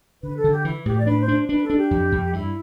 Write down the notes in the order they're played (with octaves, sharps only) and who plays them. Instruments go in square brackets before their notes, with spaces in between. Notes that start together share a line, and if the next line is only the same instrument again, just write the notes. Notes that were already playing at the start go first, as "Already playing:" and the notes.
[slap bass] D3 [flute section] B4
[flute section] A4
[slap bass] D3
[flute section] G4
[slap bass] E3 [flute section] E4
[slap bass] A2 [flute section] G4
[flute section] D5
[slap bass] D4 [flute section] B4
[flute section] C5
[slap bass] D4
[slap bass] D4 [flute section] B4
[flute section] A4
[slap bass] D4
[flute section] G4
[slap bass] F2
F2
[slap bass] G2 [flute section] E4